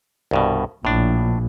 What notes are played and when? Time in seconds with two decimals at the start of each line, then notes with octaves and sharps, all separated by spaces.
0.31 C2 G2 B2
0.85 A#1 A2 D4